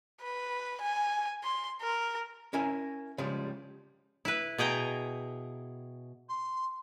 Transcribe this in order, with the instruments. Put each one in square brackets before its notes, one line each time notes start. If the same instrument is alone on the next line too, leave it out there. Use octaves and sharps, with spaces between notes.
[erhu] B4
G#5
C6
A#4
[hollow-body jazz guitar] C#4 E4 A#4 G#5
C#3 F3 G3 G#3
[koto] E4 B4
B2 G#4 G5 A#5
[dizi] C6